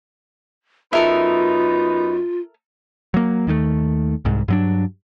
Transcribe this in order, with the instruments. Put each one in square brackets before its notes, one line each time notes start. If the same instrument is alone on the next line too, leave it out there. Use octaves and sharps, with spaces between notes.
[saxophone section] F#2 B3 D#4 [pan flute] F4 [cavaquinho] A4 A#4 E5
[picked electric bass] F#3 A#3
D#2 D#3 G#3 A3
C2 G#2
G2 F#3 D4